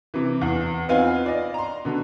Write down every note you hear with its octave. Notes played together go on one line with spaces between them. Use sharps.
C3 E3
E2
B3 C4 D#4 F4 F5 G#5
D5 D#5
A#5 C6
B2 D3